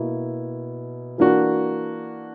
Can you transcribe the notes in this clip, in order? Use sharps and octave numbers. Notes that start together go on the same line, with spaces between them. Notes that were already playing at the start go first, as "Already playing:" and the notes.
Already playing: B2 A#3 E4
E3 A#3 D4 F#4